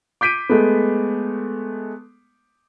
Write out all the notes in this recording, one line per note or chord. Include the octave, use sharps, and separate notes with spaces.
D6 G6 B6 D7 D#7
G#3 A3 B3